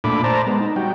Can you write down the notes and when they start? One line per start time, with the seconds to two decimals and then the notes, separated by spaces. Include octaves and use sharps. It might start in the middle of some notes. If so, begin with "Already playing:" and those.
0.04 A#2 A3 D4 B5 D6
0.24 C5 D5 A5 A#5
0.47 G#3 B3
0.60 D#4
0.76 G3 F#4 G5